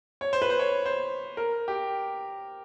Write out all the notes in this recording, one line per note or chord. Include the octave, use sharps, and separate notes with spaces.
C#5
C5
B4
C5
C#5
C5
A#4
G4